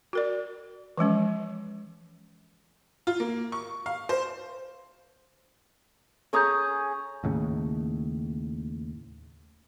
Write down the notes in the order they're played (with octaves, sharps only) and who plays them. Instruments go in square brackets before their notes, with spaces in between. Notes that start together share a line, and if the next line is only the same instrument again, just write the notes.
[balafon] F#4 A#4 D5
E3 F3 G#3 C#4
[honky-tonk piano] F4
A#3
C#6
F5
C5
[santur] C#4 G#4 A#5 [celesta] A4 D#6 G6
[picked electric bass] D#2 A2 C#3